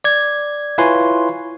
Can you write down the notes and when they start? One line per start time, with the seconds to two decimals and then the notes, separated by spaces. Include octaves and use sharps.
0.04 D5 G#6
0.78 E4 F4 B4 C#5 G#5 C6